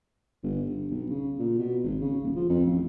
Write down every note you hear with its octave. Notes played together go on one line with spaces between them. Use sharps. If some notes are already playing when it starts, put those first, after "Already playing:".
G1
G2
B1
C#3
A#2
B2
G#1
C#3
D#1
F3
F2
A1